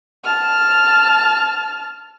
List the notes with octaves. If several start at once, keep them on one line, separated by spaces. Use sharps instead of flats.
A5 F6